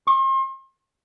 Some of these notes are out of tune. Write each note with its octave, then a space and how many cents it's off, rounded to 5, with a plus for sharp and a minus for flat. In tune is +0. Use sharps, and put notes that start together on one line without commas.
C6 +40